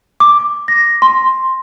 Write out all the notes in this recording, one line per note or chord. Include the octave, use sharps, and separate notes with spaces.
D6
A#6
C6